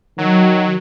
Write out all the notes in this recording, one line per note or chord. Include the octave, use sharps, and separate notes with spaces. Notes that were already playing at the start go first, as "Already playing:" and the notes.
D#3 F#3